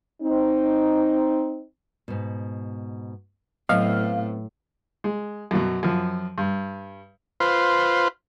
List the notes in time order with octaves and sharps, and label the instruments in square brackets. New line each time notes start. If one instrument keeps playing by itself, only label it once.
[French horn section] C4 D#4
[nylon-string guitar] G#2 B2
[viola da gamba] A2 [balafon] F#3 [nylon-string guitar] B3 C4 [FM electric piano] F5
[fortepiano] G#3
F#2 B2 F#3
F#2 F3
G2
[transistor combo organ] F4 B4 C5